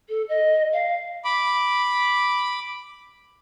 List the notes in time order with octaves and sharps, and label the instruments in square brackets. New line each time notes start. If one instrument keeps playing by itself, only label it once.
[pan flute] A4
D#5
F5
[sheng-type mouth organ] B5 D6